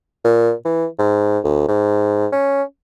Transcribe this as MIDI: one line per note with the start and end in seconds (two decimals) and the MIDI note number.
0.24 0.52 46
0.65 0.86 52
0.98 1.39 44
1.44 1.64 38
1.68 2.27 44
2.32 2.63 61